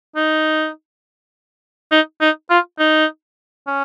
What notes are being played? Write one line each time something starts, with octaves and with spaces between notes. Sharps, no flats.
D#4
D#4
D#4
F4
D#4
C#4